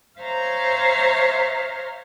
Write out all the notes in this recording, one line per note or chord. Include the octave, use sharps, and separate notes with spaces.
C5 C#5 E5 F5 A#5 C6